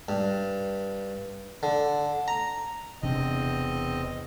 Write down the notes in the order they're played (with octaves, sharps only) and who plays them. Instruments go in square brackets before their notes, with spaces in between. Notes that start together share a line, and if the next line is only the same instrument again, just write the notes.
[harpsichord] G2
D3
A#5
[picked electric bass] E1 C3 D4 [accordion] E2 C4 D#5